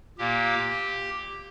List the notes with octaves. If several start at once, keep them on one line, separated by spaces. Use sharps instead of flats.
A#2 A#3 G4